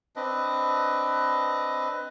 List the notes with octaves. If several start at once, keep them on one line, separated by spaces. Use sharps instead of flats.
C4 D4 B4 D#5